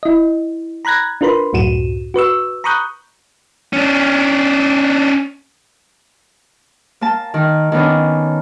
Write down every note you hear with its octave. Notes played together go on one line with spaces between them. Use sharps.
E4 D#5
A#5 B5 F#6 G#6 A#6
D4 F4 A#4 B4 B5 C6
C#2 F#2 A2 F#4 D#7 E7
F#4 B4 C#6 E6
A#5 B5 C#6 D#6 F#6 G6
C#4 D4
A#3 A5
D#3
D#3 B3 C#4 D4